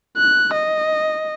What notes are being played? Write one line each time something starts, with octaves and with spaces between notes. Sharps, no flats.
F#6
D#5